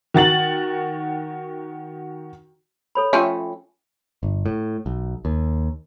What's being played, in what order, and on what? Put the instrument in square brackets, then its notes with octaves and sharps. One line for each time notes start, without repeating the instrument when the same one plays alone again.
[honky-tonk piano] D#3 F#4 A6 F#7
[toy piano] A4 C#5 B5
[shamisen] F3 A3 C#4 [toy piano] E5 G5
[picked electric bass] G1
A2
B1
D#2